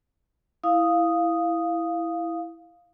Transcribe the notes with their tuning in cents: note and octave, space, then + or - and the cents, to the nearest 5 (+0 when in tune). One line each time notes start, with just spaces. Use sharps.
E4 +0 F5 +0 D#6 +0